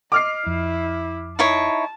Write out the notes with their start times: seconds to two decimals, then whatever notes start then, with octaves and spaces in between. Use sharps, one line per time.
0.12 D#5 D6 F6 C7
0.47 F2 E4
1.39 D#4 E4 C#5 A5